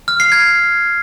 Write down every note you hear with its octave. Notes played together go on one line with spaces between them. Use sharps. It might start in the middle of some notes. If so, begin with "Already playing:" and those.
F6
C7
G#6